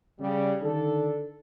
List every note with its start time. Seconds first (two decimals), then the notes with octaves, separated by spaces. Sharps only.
0.20 C#3 G3
0.61 D3 D#3 D4 A4